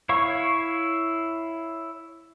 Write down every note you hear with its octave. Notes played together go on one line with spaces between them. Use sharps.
E4 C#5 F5 C#6